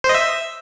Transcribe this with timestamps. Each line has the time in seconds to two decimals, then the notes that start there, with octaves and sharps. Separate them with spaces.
0.04 C5
0.09 D#5
0.15 E5